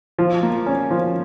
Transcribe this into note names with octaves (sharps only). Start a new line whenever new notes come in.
F3
A#3
C#4
F3